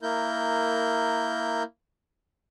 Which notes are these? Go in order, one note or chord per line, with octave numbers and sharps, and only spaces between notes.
A#3 E4 A#4 G6